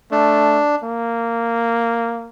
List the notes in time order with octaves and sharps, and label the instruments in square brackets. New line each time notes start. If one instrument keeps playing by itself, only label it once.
[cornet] A3 [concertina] D4
[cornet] A#3